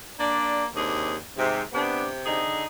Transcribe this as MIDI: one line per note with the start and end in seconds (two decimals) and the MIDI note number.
0.19 0.68 58
0.19 0.63 62
0.19 0.63 74
0.75 1.17 39
0.75 1.12 48
0.75 1.12 62
0.75 1.12 68
1.37 1.64 44
1.37 1.62 48
1.73 2.42 48
1.73 2.06 59
1.73 2.06 62
2.24 2.64 50
2.24 2.64 63
2.24 2.64 68